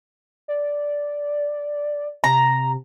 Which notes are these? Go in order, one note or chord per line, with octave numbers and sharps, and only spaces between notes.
D5
C3 A#5